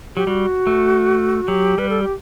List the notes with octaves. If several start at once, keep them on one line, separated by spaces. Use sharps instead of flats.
F#3 G4
G3 F#4
A3
F#3 G4
G3 B4
A4
G4